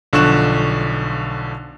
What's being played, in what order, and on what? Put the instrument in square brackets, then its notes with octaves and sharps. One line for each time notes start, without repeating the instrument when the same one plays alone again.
[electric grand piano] B1 D3 F3 C#6 F#6 E7